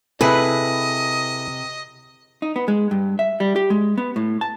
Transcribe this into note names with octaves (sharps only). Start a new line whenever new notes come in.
C3 E4 G#4 A4 B4 D#5
D#4
B3
G#3
G2
E5
G3
G4
G#3
B3
A2
A5